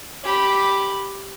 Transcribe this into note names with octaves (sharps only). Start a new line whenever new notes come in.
G4 B5